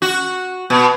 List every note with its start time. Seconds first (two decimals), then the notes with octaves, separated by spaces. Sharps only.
0.02 F#4
0.70 B2